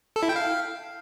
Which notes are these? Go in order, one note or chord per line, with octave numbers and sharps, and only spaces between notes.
A4
E4
G5
F5